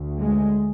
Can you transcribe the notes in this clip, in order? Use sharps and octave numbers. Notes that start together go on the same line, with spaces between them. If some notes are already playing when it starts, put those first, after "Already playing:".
Already playing: D2
G#3